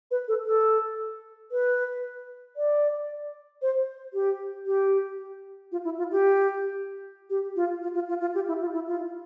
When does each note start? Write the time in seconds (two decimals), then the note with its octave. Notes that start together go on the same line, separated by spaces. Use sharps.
0.11 B4
0.28 A4
0.46 A4
1.52 B4
2.56 D5
3.62 C5
4.14 G4
4.66 G4
5.72 F4
5.84 E4
5.98 F4
6.12 G4
7.30 G4
7.56 F4
7.83 F4
7.94 F4
8.09 F4
8.21 F4
8.35 G4
8.48 E4
8.61 F4
8.74 E4
8.88 F4